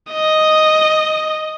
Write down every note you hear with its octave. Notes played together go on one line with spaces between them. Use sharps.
D#5